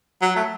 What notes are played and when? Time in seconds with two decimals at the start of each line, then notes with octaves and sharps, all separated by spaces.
0.22 F#3
0.36 A3